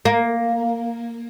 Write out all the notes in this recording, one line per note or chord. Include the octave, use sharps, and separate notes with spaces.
A#3